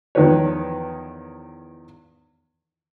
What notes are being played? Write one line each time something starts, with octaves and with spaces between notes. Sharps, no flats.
E2 D#3 F3 B4 C#5